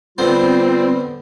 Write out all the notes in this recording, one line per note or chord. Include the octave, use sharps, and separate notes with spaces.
D3 G3 B3 C4 F4 C5